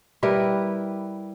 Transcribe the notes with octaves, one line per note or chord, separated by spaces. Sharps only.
G3 E4 A#4 B4